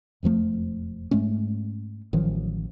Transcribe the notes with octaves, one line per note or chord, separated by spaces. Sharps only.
E1 F2 F3 A3
G#2 G#3 A3 C#4
A1 D#3 F3 F#3